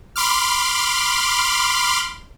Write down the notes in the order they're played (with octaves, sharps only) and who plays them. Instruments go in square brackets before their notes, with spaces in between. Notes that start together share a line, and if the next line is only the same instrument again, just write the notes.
[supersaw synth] B5 C6 D6 F6